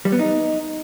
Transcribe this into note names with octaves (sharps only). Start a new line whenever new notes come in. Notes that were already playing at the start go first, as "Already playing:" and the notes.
G3
B3
D#4